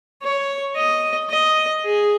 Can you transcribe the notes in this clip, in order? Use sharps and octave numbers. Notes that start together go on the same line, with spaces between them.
C#5
D#5
D#5
G#4